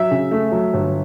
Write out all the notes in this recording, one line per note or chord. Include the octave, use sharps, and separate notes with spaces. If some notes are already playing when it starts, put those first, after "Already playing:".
Already playing: F#3 E5
C#3
A3
F#3
G1